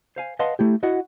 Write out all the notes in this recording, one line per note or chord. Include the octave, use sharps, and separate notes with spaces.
C5 F5 G#5
B4 D#5 F5 F#5 A5 C6
A3 E4 G4
E4 F#4 D#5 F#5